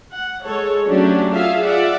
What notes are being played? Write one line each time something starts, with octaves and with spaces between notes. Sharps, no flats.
F#5
G#3 A4 C#5
F#3 A3 C#4 D4 F#4 G4
F4 G#4 A4 E5 F5
F4 D5 E5 F#5